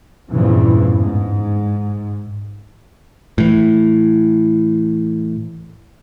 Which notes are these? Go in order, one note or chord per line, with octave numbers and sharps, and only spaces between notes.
E2 G2 A#2 C#3 E3 F3
G#2
A2 E3